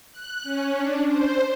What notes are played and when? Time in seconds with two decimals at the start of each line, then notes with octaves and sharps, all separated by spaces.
0.12 F#6
0.44 C#4
0.77 D4
1.07 C5